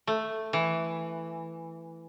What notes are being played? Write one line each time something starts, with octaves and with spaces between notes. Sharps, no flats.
A3
E3